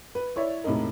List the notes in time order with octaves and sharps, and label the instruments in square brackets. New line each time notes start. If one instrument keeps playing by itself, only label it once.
[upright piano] B4
E4 C#5 D5 E5
E1 A2 C3 D#4 A#4